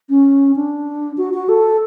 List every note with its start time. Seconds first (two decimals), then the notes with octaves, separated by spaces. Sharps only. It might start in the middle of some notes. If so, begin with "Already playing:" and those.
0.09 C#4
0.56 D4
1.17 F#4
1.34 F#4
1.49 A4